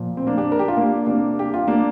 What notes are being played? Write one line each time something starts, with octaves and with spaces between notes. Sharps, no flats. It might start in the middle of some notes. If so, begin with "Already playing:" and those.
Already playing: A#2 F3
C4
A#3 D4
D4 G4
A#4
G4
F4
A#3 D4
C3 G3 A#3 D4
G4
F4
A#3 D4